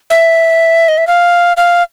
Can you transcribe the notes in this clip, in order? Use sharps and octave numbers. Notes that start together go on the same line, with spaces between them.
E5
D#5
E5
F5
F5